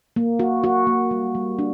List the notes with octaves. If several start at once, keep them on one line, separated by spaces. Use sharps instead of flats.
A#3
F#4
F#4
A#3
G3
G3
D4